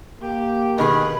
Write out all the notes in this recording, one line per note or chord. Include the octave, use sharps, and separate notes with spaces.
A#3 G4
B2 D#3 G#4 B4 B5